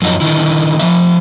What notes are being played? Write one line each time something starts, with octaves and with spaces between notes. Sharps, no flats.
F#2 F3 F#3 D#4 F#4
D3 D#3 E4
F3 G#3 E5